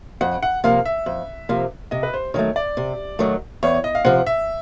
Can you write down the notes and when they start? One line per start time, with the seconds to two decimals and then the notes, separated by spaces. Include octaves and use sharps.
0.21 F2 F#5
0.43 F#5
0.64 C3 F3 A#3 F5
0.85 E5
1.06 F2
1.49 C3 F3 A#3
1.91 C3 D#5
2.03 B4
2.14 C5
2.34 D#3 F#3 A3 C#5
2.56 D5
2.77 C3
3.19 D#3 F#3 A3
3.63 E2 C#5
3.84 D#5
3.95 F5
4.05 C3 F3 F#5
4.26 E5